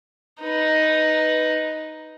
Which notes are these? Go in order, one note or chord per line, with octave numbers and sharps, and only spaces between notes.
D#4 B4